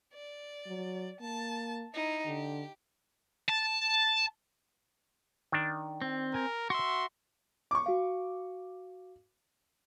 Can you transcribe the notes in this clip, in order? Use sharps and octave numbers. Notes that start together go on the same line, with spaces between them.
D5
F#3
A#3 A5
D#4 E4
D3 G4
A5
D#3 D4
C4
A#4 G#5
F#4 E5 C6
C#6 D6
F#4 F5